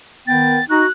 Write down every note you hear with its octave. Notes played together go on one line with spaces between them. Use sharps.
D#3 B3 G5 A6
D#4 F#4 F#6